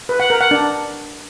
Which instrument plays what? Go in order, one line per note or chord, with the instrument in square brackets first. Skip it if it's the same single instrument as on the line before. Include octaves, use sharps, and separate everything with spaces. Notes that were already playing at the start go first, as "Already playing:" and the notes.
[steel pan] B4
F#5
A#4
F#5
D4